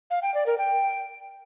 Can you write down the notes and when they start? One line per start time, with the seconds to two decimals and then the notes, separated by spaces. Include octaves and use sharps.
0.10 F5
0.22 G5
0.34 D5
0.46 A#4
0.58 G5